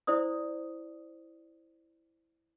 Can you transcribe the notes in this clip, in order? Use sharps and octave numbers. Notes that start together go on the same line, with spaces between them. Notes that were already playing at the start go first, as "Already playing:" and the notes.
E4 C5 D5 D#6